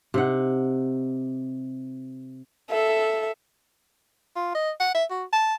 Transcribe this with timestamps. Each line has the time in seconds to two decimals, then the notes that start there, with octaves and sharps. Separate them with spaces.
0.14 C3 D#4 F#5
2.70 A4 E5
4.36 F4
4.55 D#5
4.80 F#5
4.94 E5
5.11 F#4
5.33 A5